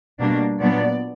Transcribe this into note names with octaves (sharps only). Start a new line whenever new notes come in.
B2 G3 A#3 D4
A#2 F#3 B3 D4 D5